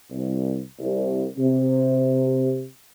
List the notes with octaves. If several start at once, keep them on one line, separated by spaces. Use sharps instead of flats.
C2
C2
C3